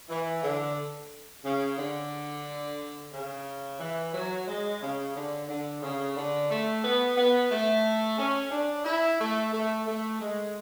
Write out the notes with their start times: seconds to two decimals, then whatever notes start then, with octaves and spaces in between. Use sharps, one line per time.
0.09 E3
0.43 D3
1.44 C#3
1.78 D3
3.13 C#3
3.80 E3
4.13 F#3
4.47 G#3
4.81 C#3
5.15 D3
5.48 D3
5.82 C#3
6.16 D3
6.49 A3
6.83 B3
7.17 B3
7.50 A3
8.18 C#4
8.51 D4
8.85 E4
9.19 A3
9.52 A3
9.86 A3
10.20 G#3